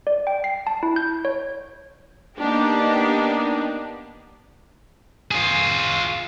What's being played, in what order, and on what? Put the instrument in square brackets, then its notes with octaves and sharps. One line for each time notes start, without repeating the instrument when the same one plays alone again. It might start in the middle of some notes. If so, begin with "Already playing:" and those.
[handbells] D5
G5
C7
A5
E4
G6
C#5
[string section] A#3 B3 D4 D#4 G4
[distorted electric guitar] F4 G#4